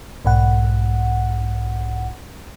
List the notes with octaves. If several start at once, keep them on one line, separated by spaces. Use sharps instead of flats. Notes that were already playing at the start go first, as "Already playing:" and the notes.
B1 G#2 F#5